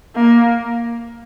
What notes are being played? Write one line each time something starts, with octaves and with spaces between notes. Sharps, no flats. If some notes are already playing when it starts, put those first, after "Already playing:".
A#3